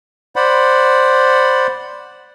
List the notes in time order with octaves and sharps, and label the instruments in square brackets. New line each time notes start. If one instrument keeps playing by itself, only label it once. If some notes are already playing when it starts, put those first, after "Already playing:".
[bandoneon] C5 D5 F#5 B5